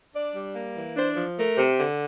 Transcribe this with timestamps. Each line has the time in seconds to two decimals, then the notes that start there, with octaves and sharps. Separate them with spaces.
0.14 D4 D5
0.35 G3
0.55 A#3
0.75 E3
0.96 D4 C5
1.16 F3
1.37 A3 A#4
1.57 C3
1.78 D3